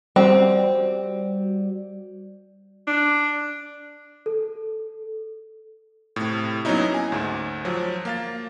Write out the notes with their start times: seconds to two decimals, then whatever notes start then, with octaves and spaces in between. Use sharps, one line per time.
0.16 G3 C4 F#4 D5
2.87 D4
4.26 A4
6.16 A2 C3
6.65 F#3 A#3 B3 C#4 D#4 E4
6.94 G#5
7.12 D2 G#2
7.65 F3 F#3
8.05 A#3 F5 A6